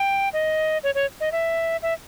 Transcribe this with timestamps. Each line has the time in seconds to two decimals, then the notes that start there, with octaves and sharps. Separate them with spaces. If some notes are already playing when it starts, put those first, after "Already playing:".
Already playing: G5
0.33 D#5
0.84 C#5
0.95 C#5
1.20 D#5
1.32 E5
1.82 E5